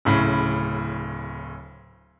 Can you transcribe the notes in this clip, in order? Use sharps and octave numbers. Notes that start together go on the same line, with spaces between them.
D1 A2 C#3 B5